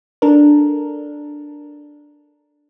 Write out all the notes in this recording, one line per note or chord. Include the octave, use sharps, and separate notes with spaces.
D4 A4 A#4